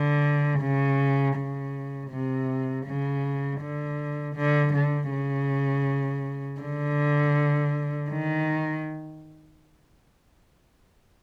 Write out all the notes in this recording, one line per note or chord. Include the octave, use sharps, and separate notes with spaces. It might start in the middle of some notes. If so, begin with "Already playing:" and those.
Already playing: D3
C#3
C#3
C3
C#3
D3
D3
D3
C#3
D3
D#3